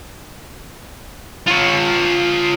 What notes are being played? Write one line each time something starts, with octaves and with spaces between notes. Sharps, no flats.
F4 C#5